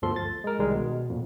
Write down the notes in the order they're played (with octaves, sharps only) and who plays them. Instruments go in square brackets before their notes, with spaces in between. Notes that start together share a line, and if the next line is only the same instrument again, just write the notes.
[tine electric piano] G1 D2 F3 A4 C6
A6
G#3 A#4
C2 D#3 G3 G#3
B2
F2 A#2